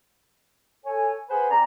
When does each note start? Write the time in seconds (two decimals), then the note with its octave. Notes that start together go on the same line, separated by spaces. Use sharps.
0.84 A4 C#5 G#5
1.29 G#4 B4 C5 F#5 G#5 B5
1.50 C4 C#4 D5 A#5